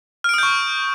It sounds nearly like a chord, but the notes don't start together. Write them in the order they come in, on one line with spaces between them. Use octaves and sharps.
F6 D7 D#6 G6 C#6